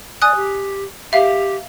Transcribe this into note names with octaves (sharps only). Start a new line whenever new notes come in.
D5 G#5 D#6 F#6
G4
G4 E5 F5